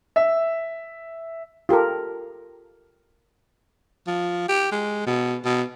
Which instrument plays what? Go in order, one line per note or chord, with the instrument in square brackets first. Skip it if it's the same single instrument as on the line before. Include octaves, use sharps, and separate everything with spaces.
[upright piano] E5
[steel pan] F4 G4 A4 A#4
[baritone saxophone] F3
G4
G#3
B2
B2